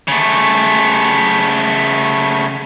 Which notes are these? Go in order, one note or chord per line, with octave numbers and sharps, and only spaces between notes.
C#3 A3